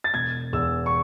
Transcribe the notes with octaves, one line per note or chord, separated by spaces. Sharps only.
A6
E1 G#6
E2 E6
C#6